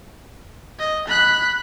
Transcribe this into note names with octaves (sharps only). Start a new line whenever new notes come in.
D#5
B5 F#6